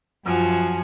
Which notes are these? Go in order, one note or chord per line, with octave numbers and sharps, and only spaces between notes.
F#2 F3 F#4 G#5